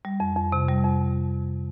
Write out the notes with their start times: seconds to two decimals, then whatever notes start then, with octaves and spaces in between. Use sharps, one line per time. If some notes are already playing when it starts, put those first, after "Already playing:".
0.05 G3
0.20 F2
0.36 F2
0.52 C3
0.69 G3
0.85 F2